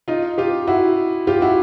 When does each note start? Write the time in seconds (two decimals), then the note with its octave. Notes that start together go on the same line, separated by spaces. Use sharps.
0.08 D#4 F4
0.38 F4 G4
0.67 E4 F#4
1.27 F4 G4
1.42 E4 F#4